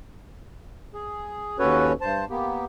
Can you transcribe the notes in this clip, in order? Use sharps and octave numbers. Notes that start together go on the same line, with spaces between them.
G#4
D#2 C#4 F#4 A4 B4 C#5
G2 C5 A5
A#3 B3 G4